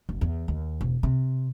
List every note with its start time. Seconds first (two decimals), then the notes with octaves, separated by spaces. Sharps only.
0.09 F#1
0.21 E2
0.48 D#2
0.81 E1
1.03 C3